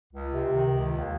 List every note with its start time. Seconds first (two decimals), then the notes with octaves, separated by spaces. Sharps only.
0.12 C#2
0.32 C3
0.53 D#3
0.72 C#2
0.92 D#2